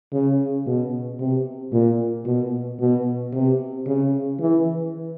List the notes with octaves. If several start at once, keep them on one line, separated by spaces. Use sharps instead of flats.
C#3
B2
C3
A#2
B2
B2
C3
C#3
E3